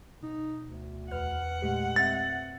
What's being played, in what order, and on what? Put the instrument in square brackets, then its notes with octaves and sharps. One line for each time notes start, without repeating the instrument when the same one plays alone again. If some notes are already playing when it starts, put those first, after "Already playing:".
[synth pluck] B2 [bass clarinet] D#4
[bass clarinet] D2
[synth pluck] E2 B4 F6 [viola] F#5
[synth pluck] A#2 A3 G4 [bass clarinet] G#3
[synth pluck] C4 E5 [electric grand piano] A6